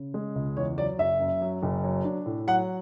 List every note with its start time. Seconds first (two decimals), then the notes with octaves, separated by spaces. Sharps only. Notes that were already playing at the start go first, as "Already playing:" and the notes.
Already playing: C#3
0.14 G#3
0.35 C#2
0.57 E2 C#5
0.78 F#3 D5
0.99 F#1 E5
1.20 F#2
1.41 F#3
1.63 F#1
1.84 F#3
2.05 D4
2.26 A2
2.47 F#3 F#5